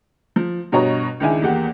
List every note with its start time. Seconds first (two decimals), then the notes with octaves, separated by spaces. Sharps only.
0.36 F3
0.72 G2 B2 F#4 C#5 D#5 A#5
1.20 C#2 D#3 D4 E4 G#5
1.42 E2 A#3 G4 F#5